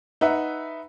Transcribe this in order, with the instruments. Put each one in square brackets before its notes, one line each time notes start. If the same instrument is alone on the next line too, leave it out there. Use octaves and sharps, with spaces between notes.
[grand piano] D#4 B4 E5 F#5